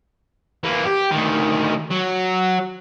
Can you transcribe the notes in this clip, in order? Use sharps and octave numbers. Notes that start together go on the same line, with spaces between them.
E3 A#3
G4
D2 D#3
F#3